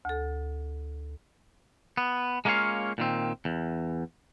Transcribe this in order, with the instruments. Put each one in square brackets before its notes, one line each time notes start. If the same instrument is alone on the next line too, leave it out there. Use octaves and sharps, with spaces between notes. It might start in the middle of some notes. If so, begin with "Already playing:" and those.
[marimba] D2 A4
[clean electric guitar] B3
G#3 A#3 C#4 F4 C#5 F5
A#2 D#3 C4
E2